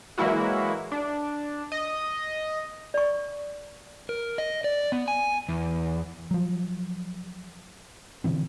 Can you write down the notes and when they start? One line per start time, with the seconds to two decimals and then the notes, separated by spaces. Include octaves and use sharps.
0.18 E3 F#3 G#3 A#3 E4 F#4
0.92 D4
1.72 D#5
2.94 D5 C#6
4.09 A#4
4.38 D#5
4.64 D5
4.92 B3
5.08 G#5
5.49 E2
6.31 F3 F#3
8.24 B2 D3 E3 C4